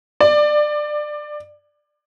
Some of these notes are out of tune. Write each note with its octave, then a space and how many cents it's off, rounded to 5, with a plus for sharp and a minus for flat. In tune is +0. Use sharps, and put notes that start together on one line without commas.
D5 +20